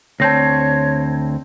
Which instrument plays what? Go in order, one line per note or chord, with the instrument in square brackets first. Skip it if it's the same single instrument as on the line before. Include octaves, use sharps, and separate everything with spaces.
[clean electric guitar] D2 C4 [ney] C#5 [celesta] A5 G6 A#6